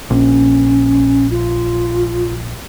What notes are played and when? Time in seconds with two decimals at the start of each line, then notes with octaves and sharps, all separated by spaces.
0.10 A#1 C#4
1.31 F4